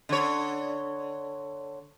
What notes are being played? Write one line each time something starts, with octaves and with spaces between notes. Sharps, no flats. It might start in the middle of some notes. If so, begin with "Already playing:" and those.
D3 C#5